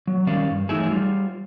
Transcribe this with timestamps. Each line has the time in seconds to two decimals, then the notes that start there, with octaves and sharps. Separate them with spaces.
0.07 F#3
0.27 D#3 G3 C#4 D5 F5
0.51 G2
0.69 E3 F#3 A3 D#4 E4 G#4
0.90 G3 F4